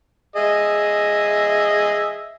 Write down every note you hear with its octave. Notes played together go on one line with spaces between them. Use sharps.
G#4 D#5 E5